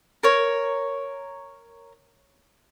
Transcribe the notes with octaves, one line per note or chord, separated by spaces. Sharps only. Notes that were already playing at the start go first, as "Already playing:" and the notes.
A#4 C#5